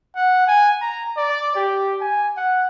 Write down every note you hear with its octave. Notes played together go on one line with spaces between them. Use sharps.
F#5
G#5
A#5
D5
G4
G#5
F#5